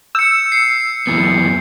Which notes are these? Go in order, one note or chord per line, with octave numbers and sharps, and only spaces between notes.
E6 G6 C#7
C7 C#7
F#2 E3 B3